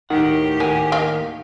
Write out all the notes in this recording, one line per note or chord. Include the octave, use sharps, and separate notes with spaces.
D2 A2 D#3 G4 F#5
D#2 A#4 F#5 G#5
A#4 D#5 F5